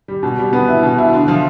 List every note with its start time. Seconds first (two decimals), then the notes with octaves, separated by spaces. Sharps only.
0.08 G3
0.23 B2
0.38 G3
0.53 B3
0.68 E4
0.83 B2
0.98 E4
1.13 D3
1.28 F3